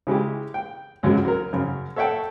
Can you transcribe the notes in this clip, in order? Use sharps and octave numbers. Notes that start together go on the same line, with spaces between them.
C#3 G#3 E4 G4
G5
C#2 F#2 F#3 G#3
F#3 A#4
F#2 C#3
A4 C#5 E5 F#5 G5 A5